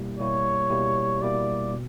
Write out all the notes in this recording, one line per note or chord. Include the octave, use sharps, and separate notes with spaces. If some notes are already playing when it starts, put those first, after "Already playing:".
Already playing: B2 G3 A#3 E4 G4
B2 G3 A#3 E4 G4 C#5
B2 G3 A#3 E4 G4
B2 G3 A#3 E4 G4 D5
B2